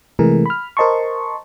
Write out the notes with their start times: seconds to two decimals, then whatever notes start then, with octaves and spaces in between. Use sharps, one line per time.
0.19 C3 E3 G#3 A3 G#4 A#4
0.46 B5 F6
0.77 A#4 C5 D#5 A5 C6 C#6